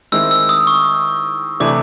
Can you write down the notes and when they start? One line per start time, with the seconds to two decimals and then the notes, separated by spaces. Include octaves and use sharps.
0.12 D#3 G#3 C4 E4 E6
0.31 E6
0.49 D#6
0.67 C#6
1.60 C3 E3 A3 D4 D6